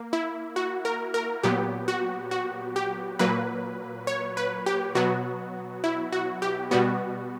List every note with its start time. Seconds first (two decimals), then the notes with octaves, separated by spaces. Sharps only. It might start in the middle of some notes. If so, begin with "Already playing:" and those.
Already playing: A#3
0.13 E4
0.56 F#4
0.85 A#4
1.14 A#4
1.43 A#2 F#3 B3 G4
1.88 F#4
2.31 F#4
2.76 G4
3.19 A#2 F#3 A#3 B4
4.07 C#5
4.37 B4
4.66 G4
4.95 B2 F#3 B3 F#4
5.84 E4
6.12 F#4
6.42 G4
6.71 B2 G3 B3 F#4